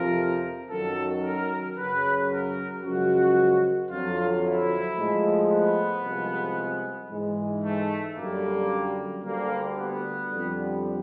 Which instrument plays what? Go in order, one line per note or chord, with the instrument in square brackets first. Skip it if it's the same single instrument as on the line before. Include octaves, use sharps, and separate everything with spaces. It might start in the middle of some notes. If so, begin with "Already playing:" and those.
Already playing: [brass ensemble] F2 C3 F3 A#4
F#2 D#3 F#3 A4
A#4
F#2 C#3 F#3 B4
A#4
F#2 C#3 F3 G#3 F#4
F2 D3 F#3 F4
E4
A2 F3 G#3
B3
C2 C3 F3 G#3
G#2 E3 G#3
A3
F#2 D3 G3 A#3
D2 D3 G3 A#3
B3
F2 D3 G3